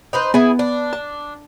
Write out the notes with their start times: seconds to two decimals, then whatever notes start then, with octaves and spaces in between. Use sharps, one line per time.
0.13 D#4 B4 C5
0.34 B3 E4 G#4
0.59 D4
0.93 A5